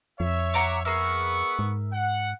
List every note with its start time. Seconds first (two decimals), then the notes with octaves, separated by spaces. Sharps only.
0.20 F2 C#5 E5
0.54 F#5 A#5 D6
0.85 B3 G#4 A#4 B4 E5 C#6
1.59 G#2
1.93 F#5